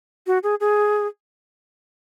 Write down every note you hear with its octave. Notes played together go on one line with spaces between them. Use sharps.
F#4
G#4
G#4